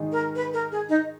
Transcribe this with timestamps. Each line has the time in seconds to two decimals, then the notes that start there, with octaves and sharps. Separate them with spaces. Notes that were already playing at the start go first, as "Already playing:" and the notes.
Already playing: G#2 D#3 G#3 D#4 G#4
0.12 A#4
0.35 B4
0.53 A#4
0.72 G#4
0.89 D#4